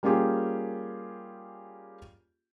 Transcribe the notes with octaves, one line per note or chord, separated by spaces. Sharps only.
G3 A#3 C#4 F4 G4 G#4